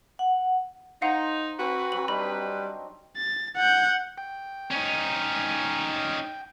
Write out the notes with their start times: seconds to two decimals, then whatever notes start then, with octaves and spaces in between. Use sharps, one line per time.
0.19 F#5
1.02 D#4 C5 F5 F#5 A#5
1.59 C4 F#4 B4
1.92 F#3 C4 F#7
2.08 G3 D4 D#4 B5
3.17 A6
3.57 F#5 G6
4.18 G5
4.71 C#4 D#4